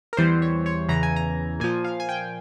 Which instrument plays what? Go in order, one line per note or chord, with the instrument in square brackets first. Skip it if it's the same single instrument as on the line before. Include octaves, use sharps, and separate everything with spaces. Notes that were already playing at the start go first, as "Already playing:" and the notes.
[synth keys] A#4
E2 E3 G3 C5
C#5
C#5
E2 C#3 E3 A#5
G#5
A#5
A#2 F3 G#5
F5
G#5
G5